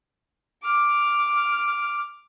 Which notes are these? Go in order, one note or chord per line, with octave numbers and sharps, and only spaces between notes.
D6 F6